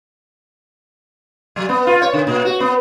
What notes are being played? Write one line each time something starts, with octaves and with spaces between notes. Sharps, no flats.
F#3
B3
F4
C#5
D3
A#2
F#4
B3